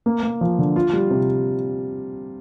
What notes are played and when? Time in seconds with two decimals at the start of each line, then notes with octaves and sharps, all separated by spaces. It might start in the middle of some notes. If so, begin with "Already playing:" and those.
0.06 A#3
0.23 A#3
0.41 F3
0.59 D3
0.76 F4
0.93 G3
1.10 C3